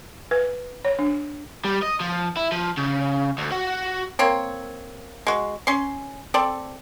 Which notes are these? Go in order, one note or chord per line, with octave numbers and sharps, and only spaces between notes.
B4
C#5
D4
G3
D#5
F3
E4
F3
C#3
D2
F#4
A#3 C4 C#5
G#3 F#4
C#4 C6
C4 A4 D5